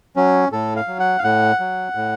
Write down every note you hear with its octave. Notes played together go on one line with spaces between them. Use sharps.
F#3 C#4
A2 A4
F5
F#3
F#5
F5
A2 F#5
F#3
A2